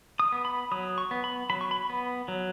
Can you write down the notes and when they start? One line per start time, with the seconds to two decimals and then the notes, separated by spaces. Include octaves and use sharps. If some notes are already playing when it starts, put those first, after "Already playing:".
0.20 D#6
0.32 B3
0.45 B5
0.71 F#3 D#6
0.98 C#6
1.11 B3
1.24 B5
1.50 F#3 B5
1.61 C#6
1.71 B5
1.90 B3
2.28 F#3